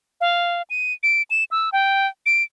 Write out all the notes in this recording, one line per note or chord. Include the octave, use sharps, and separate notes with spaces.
F5
D#7
D7
E7
E6
G5
D7